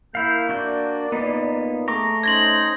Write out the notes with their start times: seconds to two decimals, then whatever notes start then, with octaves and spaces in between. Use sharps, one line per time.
0.15 A#3 E4 F5 G6
0.49 D4 F#4 D5 G6
1.12 A#2 A#3 B3 D#4
1.88 A3 G#4 A#5 C#6 D6 A#6
2.23 C#4 D#4 C5 C6 G#6 A#6 F#7